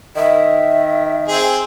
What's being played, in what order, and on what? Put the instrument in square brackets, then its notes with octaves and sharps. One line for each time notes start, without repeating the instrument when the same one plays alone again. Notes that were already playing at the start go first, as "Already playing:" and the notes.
[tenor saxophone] D#3 [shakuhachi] E5
[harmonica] C4 G#4